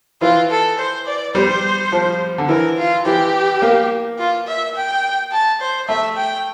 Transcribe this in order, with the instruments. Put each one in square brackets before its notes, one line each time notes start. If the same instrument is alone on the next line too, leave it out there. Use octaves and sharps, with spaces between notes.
[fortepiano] E3 [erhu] F4
[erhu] A4
C5
D5
[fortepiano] G3 [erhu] C5
[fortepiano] F3
D3
[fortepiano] E3 [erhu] A#4
[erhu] F4
[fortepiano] E3 [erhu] G4
[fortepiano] A#3
[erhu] F4
E5
G5
A5
C5
[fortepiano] A3 [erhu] E5
[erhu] G5